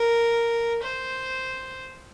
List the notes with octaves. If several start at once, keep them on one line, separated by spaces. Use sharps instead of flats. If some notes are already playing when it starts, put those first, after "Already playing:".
Already playing: A#4
C5